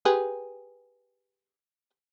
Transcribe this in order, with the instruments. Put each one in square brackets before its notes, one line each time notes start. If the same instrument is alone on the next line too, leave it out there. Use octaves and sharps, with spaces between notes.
[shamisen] G4 G#4 B4